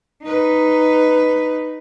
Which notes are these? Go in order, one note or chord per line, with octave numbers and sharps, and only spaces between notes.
D#4 B4